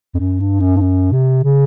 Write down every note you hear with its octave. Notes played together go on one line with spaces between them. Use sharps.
F2
F#2
G2
F#2
G2
F#2
C3
C#3